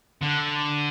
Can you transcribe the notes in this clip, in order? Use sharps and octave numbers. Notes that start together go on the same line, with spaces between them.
D3